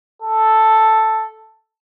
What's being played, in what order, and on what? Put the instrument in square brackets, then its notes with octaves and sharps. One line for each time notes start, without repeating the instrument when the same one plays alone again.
[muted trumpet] A4